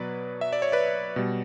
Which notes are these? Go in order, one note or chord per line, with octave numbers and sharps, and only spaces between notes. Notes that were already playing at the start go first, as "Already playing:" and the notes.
Already playing: B2 F#3 B4 D5
E5
D5
C#5
B4 D5
B2 G3